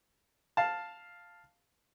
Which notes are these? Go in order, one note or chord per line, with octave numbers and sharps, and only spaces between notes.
F5 A5